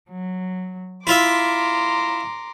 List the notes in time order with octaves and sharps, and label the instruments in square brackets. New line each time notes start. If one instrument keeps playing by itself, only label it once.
[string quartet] F#3
[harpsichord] E4 F4 E5 [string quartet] A#5 C6 D6